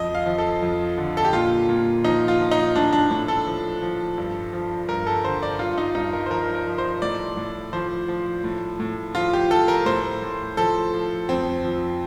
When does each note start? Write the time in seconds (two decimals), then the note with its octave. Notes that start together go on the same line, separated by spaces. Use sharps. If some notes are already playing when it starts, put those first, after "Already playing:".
Already playing: F2 D#5
0.15 F5
0.26 F3
0.38 A4
0.62 F2
0.97 D3
1.17 A4
1.25 G4
1.33 A#2 F4
1.69 A#2
2.04 F3 D#4
2.28 F4
2.39 F3
2.51 D#4
2.76 A2 D4
2.93 D4
3.11 A2 D4
3.28 A4
3.47 F3
3.82 F3
4.18 G2
4.53 F3
4.88 G2 A#4
5.07 A4
5.24 D3 C5
5.43 D5
5.59 G2 F4
5.78 D#4
5.95 G2 D#4
6.13 A#4
6.26 C5
6.30 F3 A#4
6.55 A#4
6.67 F3
6.78 C5
7.02 A2 D5
7.37 A2
7.73 F3 C5
8.08 F3
8.44 A2
8.80 A2
9.15 F3 F4
9.33 G4
9.51 F3 A4
9.68 A#4
9.86 A2 C5
10.22 A2
10.57 F3 A4
10.94 F3
11.29 F2 C4
11.64 F3